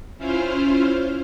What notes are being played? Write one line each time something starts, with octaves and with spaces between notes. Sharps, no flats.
C#4 E4 F4 C5 F5